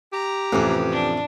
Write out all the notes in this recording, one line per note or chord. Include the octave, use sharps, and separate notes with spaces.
G4 A#5
A1 F2 C3 E3 F3
D4